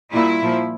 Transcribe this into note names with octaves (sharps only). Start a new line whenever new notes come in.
A#2 G3 E4
A#2 F3